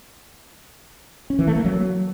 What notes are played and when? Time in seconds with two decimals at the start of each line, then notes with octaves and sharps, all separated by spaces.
1.30 C#4
1.39 E3
1.47 A3
1.56 A#3
1.65 F#3